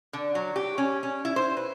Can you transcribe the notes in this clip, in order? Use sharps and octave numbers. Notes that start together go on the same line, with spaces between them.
D3
F#3
G4
C#4
C#4
E4
C5
B4